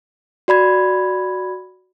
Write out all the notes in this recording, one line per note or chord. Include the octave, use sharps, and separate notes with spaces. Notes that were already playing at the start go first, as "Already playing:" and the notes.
F#4 D5 B5 G#6